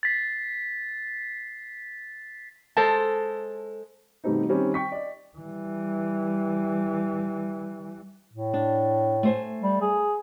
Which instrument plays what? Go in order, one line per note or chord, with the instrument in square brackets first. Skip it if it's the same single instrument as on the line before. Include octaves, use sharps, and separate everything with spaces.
[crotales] A6 B6 C7
[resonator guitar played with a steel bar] G#3 A4 C5 [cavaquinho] A5
[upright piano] B2 D#3 G3 A3 C4 D#4
D#3 G3 C4 C#4
G5 C#6 B6
D5 D#5
[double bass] E3 G3
[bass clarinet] A2
[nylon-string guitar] D4
A3 C5 G#5
[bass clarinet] G3
G#4